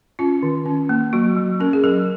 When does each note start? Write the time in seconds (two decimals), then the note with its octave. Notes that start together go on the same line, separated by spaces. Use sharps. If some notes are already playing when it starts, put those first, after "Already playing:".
0.19 C#4 F4
0.43 D#3
0.66 C#4
0.89 A#3
1.13 F#3 F#4
1.37 F#3
1.60 C#4 A#4
1.73 G#4
1.84 F#3 A#4